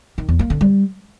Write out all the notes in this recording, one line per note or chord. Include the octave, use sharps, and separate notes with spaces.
D#3
E2
A#3
D3
G3